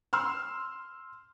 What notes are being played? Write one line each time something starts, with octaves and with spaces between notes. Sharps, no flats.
C6 E6 F6